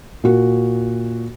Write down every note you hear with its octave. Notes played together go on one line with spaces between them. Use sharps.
A#2 F#4